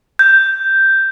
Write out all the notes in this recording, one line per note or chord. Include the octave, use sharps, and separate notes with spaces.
G6